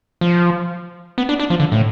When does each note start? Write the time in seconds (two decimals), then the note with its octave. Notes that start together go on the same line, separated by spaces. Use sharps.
0.21 F3
1.18 B3
1.29 D4
1.40 D4
1.50 F3
1.60 D3
1.72 A2